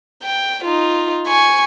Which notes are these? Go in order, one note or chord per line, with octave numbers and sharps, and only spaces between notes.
G5
D#4 F4
G#5 C#6